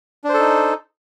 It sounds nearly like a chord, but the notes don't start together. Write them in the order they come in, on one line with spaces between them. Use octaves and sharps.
D4 C5 A4 D#4